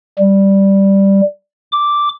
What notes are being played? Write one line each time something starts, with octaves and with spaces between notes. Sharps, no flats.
G3
D6